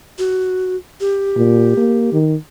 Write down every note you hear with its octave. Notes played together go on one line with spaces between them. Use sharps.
F#4
G4
A#2
A#3
D#3